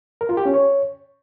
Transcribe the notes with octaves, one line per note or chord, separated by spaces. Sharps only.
A#4
F4
G4
C#4
C#5